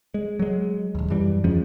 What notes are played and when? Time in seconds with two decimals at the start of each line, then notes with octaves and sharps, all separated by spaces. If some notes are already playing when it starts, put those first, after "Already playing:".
0.14 G#3
0.39 F#3 G#3
0.95 D#1 D#2
1.10 F#2 E3 G3
1.44 E2 F3 G#3 C#4